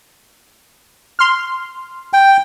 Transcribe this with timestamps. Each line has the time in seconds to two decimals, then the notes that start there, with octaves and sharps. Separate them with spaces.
1.19 C6 F6
2.13 G5